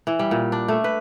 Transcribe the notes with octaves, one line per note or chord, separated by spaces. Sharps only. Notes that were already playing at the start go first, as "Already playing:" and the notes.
E3
G3
A#2
D4
A3
B4